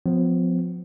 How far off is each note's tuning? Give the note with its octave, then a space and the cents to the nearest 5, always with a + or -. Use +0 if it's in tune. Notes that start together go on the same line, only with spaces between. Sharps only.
F3 +30 B3 +45